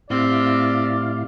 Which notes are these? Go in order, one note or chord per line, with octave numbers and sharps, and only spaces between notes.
A2 C4 E4 G4 D5 F5